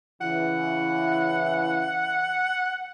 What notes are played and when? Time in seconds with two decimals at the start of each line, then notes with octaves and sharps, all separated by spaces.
0.21 C#3 E3 E4 F#5